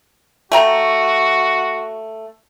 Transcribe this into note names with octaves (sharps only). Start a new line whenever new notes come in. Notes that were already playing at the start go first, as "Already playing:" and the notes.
A3 F#4 G5 A#5